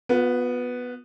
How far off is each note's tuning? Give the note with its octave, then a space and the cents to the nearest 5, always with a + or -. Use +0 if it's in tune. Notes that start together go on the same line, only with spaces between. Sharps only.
B3 +0 F4 +40